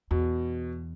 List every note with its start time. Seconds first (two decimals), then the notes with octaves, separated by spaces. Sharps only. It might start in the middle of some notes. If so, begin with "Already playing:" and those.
0.11 E2 B2